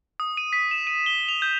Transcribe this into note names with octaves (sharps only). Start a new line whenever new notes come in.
D#6
D#7
B6
E7
D#7
G7
F7
G6